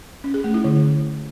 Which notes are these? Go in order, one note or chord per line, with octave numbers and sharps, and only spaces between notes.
C#4
G#4
A3
E4
D3